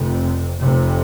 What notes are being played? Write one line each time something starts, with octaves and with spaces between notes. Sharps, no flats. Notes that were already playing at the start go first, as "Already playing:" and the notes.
Already playing: F1 F2 C3
F1 F2 C3